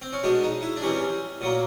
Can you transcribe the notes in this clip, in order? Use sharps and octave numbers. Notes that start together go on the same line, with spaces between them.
C4
C#4
B2 G#3 B3 D4
D#4
E4
D4
C3 E3 G3 C#4
A#2 F#3 A#3